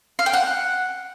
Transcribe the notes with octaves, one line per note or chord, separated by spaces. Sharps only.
F5
G5
F#5